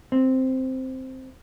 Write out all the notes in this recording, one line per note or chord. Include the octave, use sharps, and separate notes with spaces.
C4